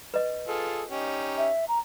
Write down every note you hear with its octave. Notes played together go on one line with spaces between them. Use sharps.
B4 D#5
F4 G#4 A4
C#4 D#4 G4
E5
A#5